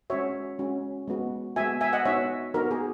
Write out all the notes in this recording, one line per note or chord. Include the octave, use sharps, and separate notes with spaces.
G#3 C#4 F#4 C#5 E5
G#3 C#4 F#4
G#3 B3 F#4
G#3 B3 F#4 E5 G#5
E5 G#5
D#5 F#5
B3 D#4 F#4 C#5 E5
B3 D#4 F#4 A#4
G#4